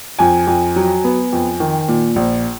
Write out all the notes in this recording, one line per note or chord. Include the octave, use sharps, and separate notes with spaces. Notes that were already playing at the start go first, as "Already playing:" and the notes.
F2 G#5
F2
F#3
B3
F2
D#3
A#2
A#1